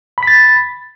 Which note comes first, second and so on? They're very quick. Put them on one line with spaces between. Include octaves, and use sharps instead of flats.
B5 B6 A6